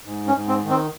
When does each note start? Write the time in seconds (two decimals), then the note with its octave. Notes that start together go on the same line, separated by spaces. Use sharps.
0.05 G#2
0.27 C#4
0.34 G#2
0.48 C4
0.63 D#3
0.69 C4